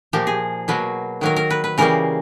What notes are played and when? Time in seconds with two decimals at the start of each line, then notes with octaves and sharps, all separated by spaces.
0.13 A#2 F3 A#3 G4
0.27 G#4
0.68 B2 F#3 A#3 B4
1.21 D#3 F#3 A#3 A#4
1.36 A#4
1.50 B4
1.64 B4
1.78 C#3 E3 G3 A#3 A#4